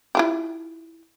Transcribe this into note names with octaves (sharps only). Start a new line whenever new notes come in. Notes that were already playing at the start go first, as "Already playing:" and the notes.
E4 F4 G4